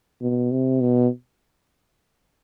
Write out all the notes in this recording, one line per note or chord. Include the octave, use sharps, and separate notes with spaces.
B2
C3
B2